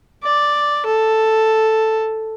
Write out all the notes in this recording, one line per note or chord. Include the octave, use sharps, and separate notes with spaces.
D5
A4